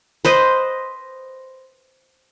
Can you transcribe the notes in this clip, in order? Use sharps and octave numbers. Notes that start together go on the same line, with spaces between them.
B4 C5 D#5